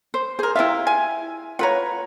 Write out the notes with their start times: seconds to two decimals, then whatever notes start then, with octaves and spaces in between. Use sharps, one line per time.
0.14 C5
0.39 G#4 A#4 C5
0.55 C3 D#3 E4 F4 E5
0.87 G#5
1.59 F4 B4 C#5 F#5 A#5